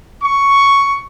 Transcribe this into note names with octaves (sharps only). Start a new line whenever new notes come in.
C#6